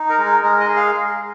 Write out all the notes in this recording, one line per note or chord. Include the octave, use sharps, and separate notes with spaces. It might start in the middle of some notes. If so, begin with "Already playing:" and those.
Already playing: D#4
A#4
G#3
A#4
G#3 A#4
D#5
G#4
F5